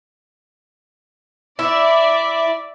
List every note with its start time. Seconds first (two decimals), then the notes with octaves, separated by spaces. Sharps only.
1.59 E4 D5 E5